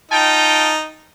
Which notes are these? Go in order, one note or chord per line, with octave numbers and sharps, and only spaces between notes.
D#4 F4 G5 A5